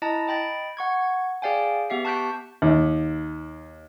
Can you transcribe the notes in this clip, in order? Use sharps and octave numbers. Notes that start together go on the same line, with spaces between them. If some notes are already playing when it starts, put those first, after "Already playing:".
E4 D#5 A5 A#5 A#6
D#5 G5 B5 A6
F#5 C#6 G#6
G#4 D5 F5 G5 G#5
B3 G4 E5 C7
A5 C#6 F#6 G6 B6 D7
D#2